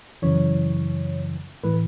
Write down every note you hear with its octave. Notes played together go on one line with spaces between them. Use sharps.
F#2 C#3 E3 C#5
A2 E3 B4